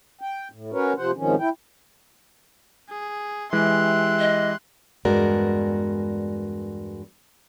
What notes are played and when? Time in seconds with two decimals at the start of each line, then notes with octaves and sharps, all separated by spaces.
0.21 G5
0.52 A2
0.73 C#4 F#4 A#4 B4 C#5
0.97 C3 F3 C5 F#5
1.17 G#2 C3 D#3 F3 C#4
1.40 E4 G5
2.90 G#4
3.53 E3 G#3 G4 E5 C6 F#6
4.19 D#5
5.05 E2 G2 G#3 F#4 A#4 D5